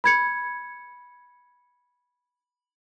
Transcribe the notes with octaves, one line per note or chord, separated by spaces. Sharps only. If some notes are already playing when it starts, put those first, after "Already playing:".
B5 G#6 C#7